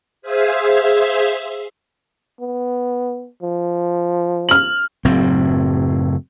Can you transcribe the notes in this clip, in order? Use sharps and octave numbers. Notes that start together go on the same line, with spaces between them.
G#4 C5 E5 F5 G#5
B3
F3
F6 F#7
F#1 A2 F#3 C4